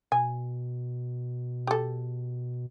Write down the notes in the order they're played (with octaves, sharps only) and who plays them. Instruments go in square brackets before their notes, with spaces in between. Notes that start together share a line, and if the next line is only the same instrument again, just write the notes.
[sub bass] B2 [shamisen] G#5
[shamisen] G4 A4